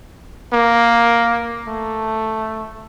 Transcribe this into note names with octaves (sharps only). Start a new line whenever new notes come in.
A#3
A3